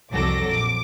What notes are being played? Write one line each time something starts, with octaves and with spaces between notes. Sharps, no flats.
C2 F2 F#3 A4 D6 A#6
A#1 D6